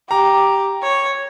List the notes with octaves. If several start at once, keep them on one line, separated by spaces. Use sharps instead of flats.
G4 A#5
C#5